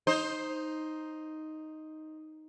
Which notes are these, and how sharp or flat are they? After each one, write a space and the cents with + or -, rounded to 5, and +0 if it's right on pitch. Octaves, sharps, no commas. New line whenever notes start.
D#4 +0 C5 +10